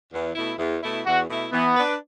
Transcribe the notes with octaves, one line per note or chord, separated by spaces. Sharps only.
E2
B2 A3 E4
E2
B2 A3 E4
E2 F#4
B2 A3 E4
E3 B3
D4 B4